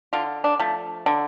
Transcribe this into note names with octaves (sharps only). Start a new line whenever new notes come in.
D3 F4
D4
F3 A3
D3